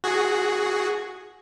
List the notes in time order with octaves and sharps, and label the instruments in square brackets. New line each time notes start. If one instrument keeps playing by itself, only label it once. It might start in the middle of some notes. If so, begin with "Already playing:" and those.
[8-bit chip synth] F#4 G#4